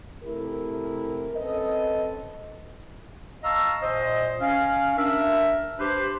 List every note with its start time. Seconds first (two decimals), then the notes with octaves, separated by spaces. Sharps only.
0.24 C3 A3 E4 G4 A#4
1.36 C4 C#4 A4 B4 D#5
3.43 D#5 F5 A5 A#5 C#6 E6
3.81 A#2 C5 D#5
4.40 C#4 F5
4.97 D4 A#4 E5
5.79 D4 G4 B4 C5